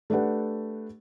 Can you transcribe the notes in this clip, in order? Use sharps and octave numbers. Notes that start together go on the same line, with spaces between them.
A3 D4 G4 B4 F#5